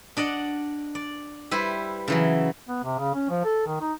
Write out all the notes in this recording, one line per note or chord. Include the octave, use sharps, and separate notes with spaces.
D4 D5 D#5 F#5
D5
G3 E4 B4 C5
C#3 E3 F#3
B3
C3
C#3
C#4
F3
A4
D#3
D#4